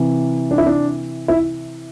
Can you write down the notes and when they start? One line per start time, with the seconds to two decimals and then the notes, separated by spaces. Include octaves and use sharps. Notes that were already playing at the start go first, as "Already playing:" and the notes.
Already playing: C3 E3
0.51 D4
0.58 E4
0.66 D4
1.28 E4